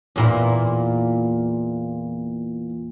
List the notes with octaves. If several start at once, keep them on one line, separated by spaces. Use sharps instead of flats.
E2 A#2 E4